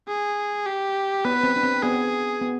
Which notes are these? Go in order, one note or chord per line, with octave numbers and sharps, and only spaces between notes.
G#4
G4
B3 B4
C4
D4
C4
B3 G#4
B3